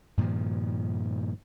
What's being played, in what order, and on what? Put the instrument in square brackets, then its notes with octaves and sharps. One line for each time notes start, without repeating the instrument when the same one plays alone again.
[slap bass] G2 A#2 D#3 F3